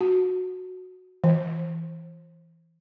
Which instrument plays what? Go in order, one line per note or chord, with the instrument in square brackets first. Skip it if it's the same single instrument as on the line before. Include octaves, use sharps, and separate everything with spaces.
[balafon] F#4
E3